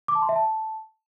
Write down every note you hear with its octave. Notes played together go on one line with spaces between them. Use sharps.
D6
A5
C6
E5
A5